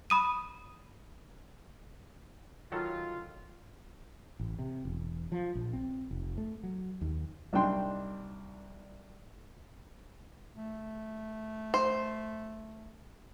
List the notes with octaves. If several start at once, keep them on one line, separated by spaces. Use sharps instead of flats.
B5 D#6 D#7
D#3 F#3 F4 A4
A1
C3
E1
F3
A#1
C4
F1
A3
F#3
D#2
C2 D4 D#4 G5 C6
A3
C5